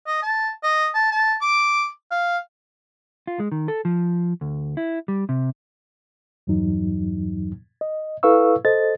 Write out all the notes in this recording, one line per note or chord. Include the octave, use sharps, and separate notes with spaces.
D#5
A5
D#5
A5
A5
D6
F5
F4
G#3
D#3
A4
F3
D2
E4
G3
C3
E2 G2 E3 F#3 D#4
D#5
E4 A4 B4 F5 C#6 E6
A4 C5 D#5 A6